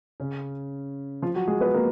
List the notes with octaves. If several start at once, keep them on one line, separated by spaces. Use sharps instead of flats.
C#3 C#4
F3 F4
F#3 F#4
G#3 G#4
B3 B4
A#3 A#4